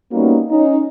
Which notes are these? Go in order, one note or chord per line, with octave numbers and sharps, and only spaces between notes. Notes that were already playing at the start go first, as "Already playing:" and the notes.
G3 A#3 B3 C#4 D#4 F#4
C#4 D#4